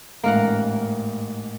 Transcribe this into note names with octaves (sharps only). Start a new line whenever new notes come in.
A1 G#2 A#3 A#4 F#5